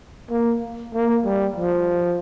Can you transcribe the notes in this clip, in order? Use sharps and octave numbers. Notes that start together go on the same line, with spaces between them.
A#3
A#3
G3
F3